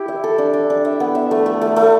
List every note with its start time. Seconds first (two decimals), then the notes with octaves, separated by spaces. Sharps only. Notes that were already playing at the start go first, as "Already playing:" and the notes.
Already playing: E4 G4
0.08 E5
0.24 A4
0.38 D4
0.53 D4
0.70 D4
0.85 E5
1.00 B3
1.15 E5
1.31 A3
1.46 A3
1.62 A3
1.76 A3